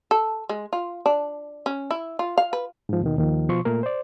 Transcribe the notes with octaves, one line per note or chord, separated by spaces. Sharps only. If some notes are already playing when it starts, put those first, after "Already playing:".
A4
G#3
F4
D4
C#4
E4
F4
F5
B4
G#2 F3
D#2 B2 D#3
D#2 D#3 F3
B2 F3 C6 C#6
A#2 A3 A#3 A#4
C5 D5